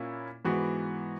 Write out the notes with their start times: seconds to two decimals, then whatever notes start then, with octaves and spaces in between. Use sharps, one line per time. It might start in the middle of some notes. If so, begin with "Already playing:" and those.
Already playing: A#2 A#3 C#4 E4
0.45 G#2 E3 B3 F#4